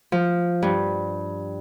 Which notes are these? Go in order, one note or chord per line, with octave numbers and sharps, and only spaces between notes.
F3
G2